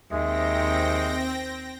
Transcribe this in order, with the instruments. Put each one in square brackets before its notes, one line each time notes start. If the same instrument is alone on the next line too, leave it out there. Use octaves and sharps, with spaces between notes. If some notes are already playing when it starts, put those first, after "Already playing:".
[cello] D#2 [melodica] G#3 [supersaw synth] C4 G5 A#6 [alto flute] E5